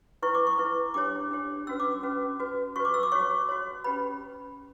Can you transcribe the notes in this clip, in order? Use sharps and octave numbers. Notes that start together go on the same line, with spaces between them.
E4 B4 C#6
D6
C#6
E4 B4
D4 G4 C#5 D6
D4 G4 C#5
C#4 F#4 B4 E6
D6
C#4 F#4 B4
F#4 B4
F#4 B4 C#6
D6
E6
D6
F#4 C#5 C#6
F#4 C#5
C#4 G4 B4 B5